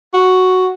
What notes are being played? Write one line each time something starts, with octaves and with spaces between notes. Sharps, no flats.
F#4